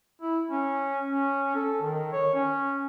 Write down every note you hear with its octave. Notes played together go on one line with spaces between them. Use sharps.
E4
C#4
C#4
A4
D#3
C#5
C#4